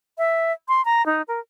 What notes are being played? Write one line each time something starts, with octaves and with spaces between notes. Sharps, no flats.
E5
C6
A#5
D#4
A#4